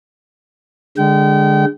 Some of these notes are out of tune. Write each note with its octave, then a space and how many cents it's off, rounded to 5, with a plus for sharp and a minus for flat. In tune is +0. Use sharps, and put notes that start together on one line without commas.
D3 +0 G#3 -20 G5 -35